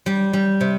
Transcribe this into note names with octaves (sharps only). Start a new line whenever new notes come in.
G3
G3
C3